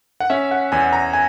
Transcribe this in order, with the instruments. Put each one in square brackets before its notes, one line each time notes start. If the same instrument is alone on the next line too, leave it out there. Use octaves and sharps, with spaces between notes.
[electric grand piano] F#5
C#4 E5
F#5
E2 G#5
A#5
G#5